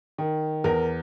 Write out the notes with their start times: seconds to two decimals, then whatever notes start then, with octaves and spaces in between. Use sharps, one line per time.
0.18 D#3
0.64 E2 A#4